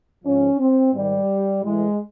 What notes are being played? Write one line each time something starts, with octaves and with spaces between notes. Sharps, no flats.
G#2 F3 C#4
C4
G#2 D#3 G3
A2 E3 G#3